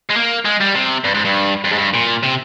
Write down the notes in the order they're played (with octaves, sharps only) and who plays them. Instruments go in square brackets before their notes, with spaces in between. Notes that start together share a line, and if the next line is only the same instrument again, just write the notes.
[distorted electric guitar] G#3
A#3
G#3
G3
C3
G2
G#2
G2
F2
G#2
G2
A#2
C3